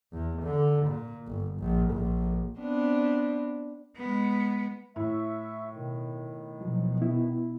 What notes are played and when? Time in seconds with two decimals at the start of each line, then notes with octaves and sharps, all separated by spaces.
0.12 E2
0.43 D3
0.87 A#2
1.27 G1
1.59 A#1
1.92 A#1
2.58 B3 C4 D4
3.97 G#3 B3
4.96 A2 E5 C#6
5.73 B2 D#3
6.61 B2 F3 F#3
7.02 B3 E4